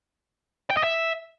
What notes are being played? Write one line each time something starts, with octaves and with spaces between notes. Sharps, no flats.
G5
D#5
E5